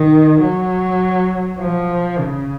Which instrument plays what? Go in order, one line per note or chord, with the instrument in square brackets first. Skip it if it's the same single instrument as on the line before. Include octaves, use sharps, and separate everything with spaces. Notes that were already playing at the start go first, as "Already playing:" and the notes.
Already playing: [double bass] D#3
F#3
F3
C#3